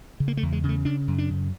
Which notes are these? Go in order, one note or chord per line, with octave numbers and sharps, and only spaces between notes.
C#3
A#3
A3
E2
G#3
C#3
A3
C#3 D4
F#2
D4
C#3